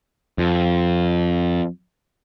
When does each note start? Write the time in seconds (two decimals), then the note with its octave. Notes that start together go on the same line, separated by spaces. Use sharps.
0.38 F2